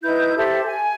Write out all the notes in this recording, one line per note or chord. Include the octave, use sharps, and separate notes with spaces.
D#4 E4 B4 G6
G4 A4 C5 E5
G#5